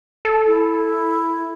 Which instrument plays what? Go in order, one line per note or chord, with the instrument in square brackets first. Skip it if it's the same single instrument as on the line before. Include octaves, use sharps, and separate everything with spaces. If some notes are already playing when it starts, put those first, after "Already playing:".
[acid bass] A4
[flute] E4